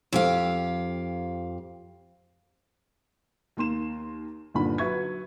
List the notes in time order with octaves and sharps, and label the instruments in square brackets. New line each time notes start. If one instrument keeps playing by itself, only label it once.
[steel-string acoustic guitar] F2 G4 F5
[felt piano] D#2 A#3 C6 E7
G1 D#2 A#2 D3 B5
F#3 B4 E5 C#6 G#6